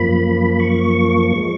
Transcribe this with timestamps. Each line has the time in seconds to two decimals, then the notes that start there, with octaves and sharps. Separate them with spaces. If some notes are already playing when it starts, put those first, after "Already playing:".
Already playing: F#2 F3 A#3 B5
0.60 C#6
1.36 F3 G#3